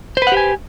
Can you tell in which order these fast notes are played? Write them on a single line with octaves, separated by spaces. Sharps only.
C5 B4 F#5 G4 G#5